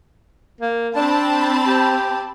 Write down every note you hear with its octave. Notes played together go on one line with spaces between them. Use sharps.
A#3
C4 D4 A5 B5
G4